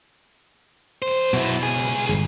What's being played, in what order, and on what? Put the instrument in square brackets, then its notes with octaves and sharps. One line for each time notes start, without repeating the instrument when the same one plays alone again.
[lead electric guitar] E2 C5
[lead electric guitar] F#2 E4 [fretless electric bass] B2
[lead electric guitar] C#2 G#4
[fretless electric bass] G1